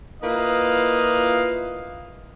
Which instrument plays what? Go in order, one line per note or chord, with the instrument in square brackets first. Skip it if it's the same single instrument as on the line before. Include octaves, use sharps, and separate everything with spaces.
[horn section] A#3 E4 F4 B4 D#5 F5